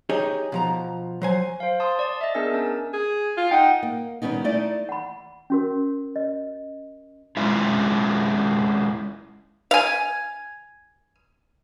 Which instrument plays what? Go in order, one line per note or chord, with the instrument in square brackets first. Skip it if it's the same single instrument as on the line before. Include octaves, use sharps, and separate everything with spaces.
[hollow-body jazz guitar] D#4 G4 G#4 C#5 D#5
B2 F3 A#5
F#3 C5 G#5
[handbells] C5 F5
A5 C6 D#6
D5 A5
D#5 E5
B3 D4 G#4 A#4 G#5 E6
C#4 A#4 A5
[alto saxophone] G#4
F4
[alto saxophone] D#4 [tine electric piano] F#5 G5
[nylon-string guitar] A#3
D#3 G3 B3 C#4 D#4
A3 D#4 E4 D5
[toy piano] F#5 B5
C#4 F#4 A#4
D#5
[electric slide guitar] G#3 C#4 E4 F4
[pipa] F5 G#5